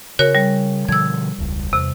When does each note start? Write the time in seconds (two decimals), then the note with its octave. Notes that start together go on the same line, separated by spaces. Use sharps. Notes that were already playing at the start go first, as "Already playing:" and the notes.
0.19 C#3 F#4 A#4 C#5
0.35 G3
0.89 B2 D3 F3 E6 G#6
1.38 E1 C#2
1.73 E2 C3